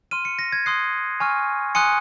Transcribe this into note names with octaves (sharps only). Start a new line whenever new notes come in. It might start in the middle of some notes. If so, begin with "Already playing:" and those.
C6 F6 D#7
C#7
A#6
G#6
C6 D#6 F#6 C7
G#5 C#6 F6
G#5 C6 D#6 F#6 C#7